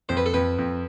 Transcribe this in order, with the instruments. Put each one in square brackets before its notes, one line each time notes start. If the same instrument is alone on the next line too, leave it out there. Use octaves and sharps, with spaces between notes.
[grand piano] F2 [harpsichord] C5
[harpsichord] B4
A4
[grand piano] F2 [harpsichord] B4
[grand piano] F2